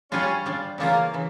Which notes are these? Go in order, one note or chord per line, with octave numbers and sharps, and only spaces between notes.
G3 C#4 D4 F4
G3 D4 F4
C#3 E3 A3 A#3 C#4 F4
C#3 E3